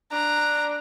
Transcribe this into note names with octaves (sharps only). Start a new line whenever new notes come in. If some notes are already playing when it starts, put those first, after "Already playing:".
D4 A#5